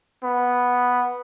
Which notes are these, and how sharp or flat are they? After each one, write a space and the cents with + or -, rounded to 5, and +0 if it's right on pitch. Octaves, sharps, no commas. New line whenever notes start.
B3 -5